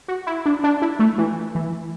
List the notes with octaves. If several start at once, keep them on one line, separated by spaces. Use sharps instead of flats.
F#4
E4
D4
D4
E4
A3
E3
E3